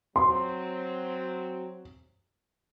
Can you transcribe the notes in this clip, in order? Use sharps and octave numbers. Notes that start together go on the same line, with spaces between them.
F#3 C4 C6